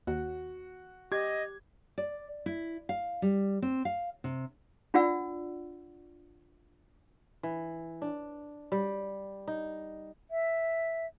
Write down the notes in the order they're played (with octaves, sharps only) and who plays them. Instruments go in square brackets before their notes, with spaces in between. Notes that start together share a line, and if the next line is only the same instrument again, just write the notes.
[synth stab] D#2 [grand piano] F#4
[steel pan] G4 [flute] D#5 [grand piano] G#6
[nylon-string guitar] D5
E4
F5
G3
C4
F5
C3
[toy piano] D4 F4 D5 F#5 E6
[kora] E3
D4
G3
D#4
[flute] E5